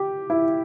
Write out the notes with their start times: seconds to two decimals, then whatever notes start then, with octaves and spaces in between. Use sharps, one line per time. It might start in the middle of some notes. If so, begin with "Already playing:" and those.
Already playing: G4
0.30 E4